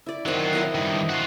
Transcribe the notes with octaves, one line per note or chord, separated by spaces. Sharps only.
E4 D5
D#3 F#3 C4 F4 F#5
E4 D#5 C6
G2 D#3
F4 F#4